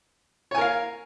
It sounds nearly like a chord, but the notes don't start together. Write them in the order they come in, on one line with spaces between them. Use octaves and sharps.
C#5 G#5 A#4 F5